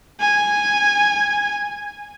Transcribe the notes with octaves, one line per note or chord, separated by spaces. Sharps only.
G#5